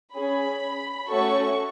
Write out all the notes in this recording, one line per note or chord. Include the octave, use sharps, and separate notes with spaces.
C#4 G#4 B5
A3 C#4 F#4 A4 C#6